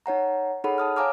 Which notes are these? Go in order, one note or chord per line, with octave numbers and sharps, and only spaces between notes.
D#4 C#5 F#5 A#5
D#4 G#4 A4 C#5 F#5 B5
A5 D#6 F6
C#5 F5 G#5 A#5 D6 F6